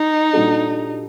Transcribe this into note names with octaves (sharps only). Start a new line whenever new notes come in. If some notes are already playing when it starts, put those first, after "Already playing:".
Already playing: D#4
A#2 G3 D4 F#4 A4